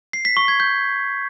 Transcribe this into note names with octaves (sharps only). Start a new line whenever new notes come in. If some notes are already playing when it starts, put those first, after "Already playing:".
C7
B6
C#6
G#6
G6